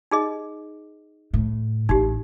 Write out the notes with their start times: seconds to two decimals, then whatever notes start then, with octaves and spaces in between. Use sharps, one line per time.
0.11 D#4 G#4 D#5
1.34 A2
1.89 A1 D#4 G4